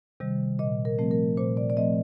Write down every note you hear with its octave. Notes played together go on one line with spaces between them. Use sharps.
C3 D#3 G3
A#2 D#5
A#4
F3 A3 C4
A#4
A#2 C5
D5
D5
F3 A3 C4 D#5